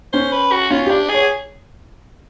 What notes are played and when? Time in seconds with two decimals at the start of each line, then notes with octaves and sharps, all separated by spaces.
0.13 C#4 C5
0.33 B4
0.52 F#4
0.70 C#4 F4
0.86 D4 G4
1.09 G#4 C#5